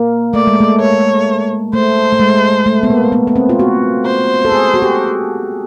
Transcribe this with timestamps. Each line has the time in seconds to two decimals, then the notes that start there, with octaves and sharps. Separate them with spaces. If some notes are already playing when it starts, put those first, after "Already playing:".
Already playing: A#3
0.34 A3 D5
0.47 G#3
0.60 A3
0.80 C#5
1.73 A3 C5
2.12 A3
2.20 G#3
2.66 A3
2.83 B3
2.90 A#3
3.12 B3
3.27 B3
3.36 C4
3.49 F4
3.59 F#4
4.06 C5
4.45 A4
4.52 G#4
4.74 F#4
4.82 G4